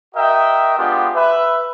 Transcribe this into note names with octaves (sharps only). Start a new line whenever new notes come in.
F#4 A#4 D#5 E5 G5
G#3 B3 D4 F4 G4
B4 E5